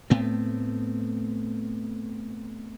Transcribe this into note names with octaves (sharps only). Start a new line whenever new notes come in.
A2 A3 B3 C4